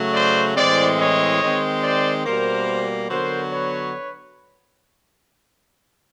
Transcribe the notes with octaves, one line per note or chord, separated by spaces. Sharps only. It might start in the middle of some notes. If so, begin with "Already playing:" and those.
Already playing: C#3 F#3 A3
C5 D5
A2 E3 G#3 C4 C5 D5
C#5 D#5
D#3 G#3 C4
C5 D5
B2 G3 A#3 A#4 C5
D3 F#3 B3 A#4 C5
B4 C#5